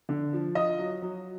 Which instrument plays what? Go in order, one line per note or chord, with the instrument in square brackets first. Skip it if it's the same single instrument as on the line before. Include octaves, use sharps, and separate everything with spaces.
[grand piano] D3
F3
F4 D#5 D#6
F#3
F#3